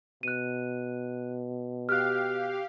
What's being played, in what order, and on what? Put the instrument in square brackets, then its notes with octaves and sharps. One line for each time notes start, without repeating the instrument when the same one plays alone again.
[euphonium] B2 [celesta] F#6 D#7
[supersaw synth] G4 F5 [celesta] F6 F#6